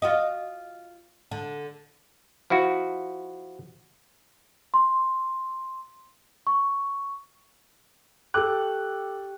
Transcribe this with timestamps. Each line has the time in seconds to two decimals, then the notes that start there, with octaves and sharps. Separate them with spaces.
0.02 F4 F#4 D#5
1.31 D3
2.50 F3 E4 F#4
4.74 C6
6.47 C#6
8.34 G4 A4 G5 D6 F#6